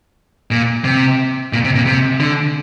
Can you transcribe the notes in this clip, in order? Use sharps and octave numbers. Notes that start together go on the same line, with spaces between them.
A#2
C3
A#2
C3
A#2
C3
D3